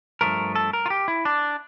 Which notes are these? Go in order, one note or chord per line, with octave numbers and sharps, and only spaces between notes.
G2 F3 A3 A#4
A4
A#4
F4
G4
E4
D4